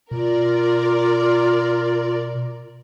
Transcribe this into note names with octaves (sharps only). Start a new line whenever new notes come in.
B2 F4 A#4 D5